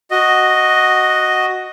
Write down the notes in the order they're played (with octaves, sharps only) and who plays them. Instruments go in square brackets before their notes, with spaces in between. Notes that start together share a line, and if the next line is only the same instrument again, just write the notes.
[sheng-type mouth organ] F#4 D#5